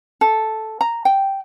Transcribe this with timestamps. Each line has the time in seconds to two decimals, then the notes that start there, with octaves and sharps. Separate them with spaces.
0.21 A4
0.81 A#5
1.05 G5